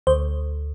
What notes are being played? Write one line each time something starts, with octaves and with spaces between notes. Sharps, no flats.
D2 C5